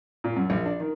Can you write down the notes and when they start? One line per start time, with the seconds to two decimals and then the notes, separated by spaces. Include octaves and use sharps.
0.24 A#2
0.36 F#2
0.50 A#1
0.66 D4
0.80 D#3